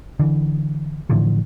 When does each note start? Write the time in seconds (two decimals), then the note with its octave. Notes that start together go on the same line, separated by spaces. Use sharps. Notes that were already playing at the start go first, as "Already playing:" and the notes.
0.20 D3 E3
1.10 A2 D3 E3 F3